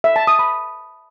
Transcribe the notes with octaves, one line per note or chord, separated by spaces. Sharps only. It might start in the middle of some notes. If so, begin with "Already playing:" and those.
E5
A5
D#6
B5